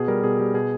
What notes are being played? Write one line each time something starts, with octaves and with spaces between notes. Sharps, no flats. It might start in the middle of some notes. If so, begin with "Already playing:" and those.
Already playing: B2 G#4
G3 A#4
B2 G#4
G3
B2 G#4